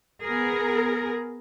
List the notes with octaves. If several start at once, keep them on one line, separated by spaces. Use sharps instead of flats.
B3 G#4 A#4